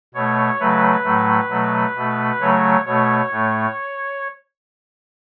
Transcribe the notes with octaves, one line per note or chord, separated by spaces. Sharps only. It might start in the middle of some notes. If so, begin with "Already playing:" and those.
B2 A3 C#5
C#3 F#3 A3 B4
A2 F#3 A3
B2 F#3 A3
B2 A3
C#3 F#3 A3 C#5
B2 A3 C#5
A2 A3